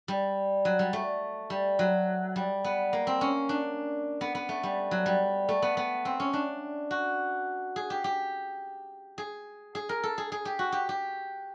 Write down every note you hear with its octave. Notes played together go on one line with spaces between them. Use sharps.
G3
F#3
G3
A3
G3
F#3
G3
B3
A#3
C4
C#4
D4
B3
B3
A3
G3
F#3
G3
A3
B3
B3
C4
C#4
D4
F#4
G#4
G4
G4
G#4
G#4
A#4
A4
G#4
G#4
G4
F#4
G4
G4